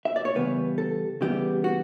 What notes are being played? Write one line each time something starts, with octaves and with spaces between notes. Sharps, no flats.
E5
D5
C#5
C#3 E3 G3 B3 B4
A4
C#3 E3 G3 B3 G4
F#4